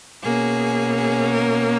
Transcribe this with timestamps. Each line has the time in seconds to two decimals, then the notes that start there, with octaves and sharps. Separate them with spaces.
0.22 B2 A#3 C#4 G#4
0.96 G#4
1.32 A#4